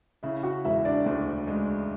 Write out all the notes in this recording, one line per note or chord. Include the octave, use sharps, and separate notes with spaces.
C#3 E4 E5
F#4 F#5
E1 E4 E5
D4 D5
D2
G#3